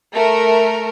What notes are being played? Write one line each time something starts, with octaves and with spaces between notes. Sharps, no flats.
A3 A#4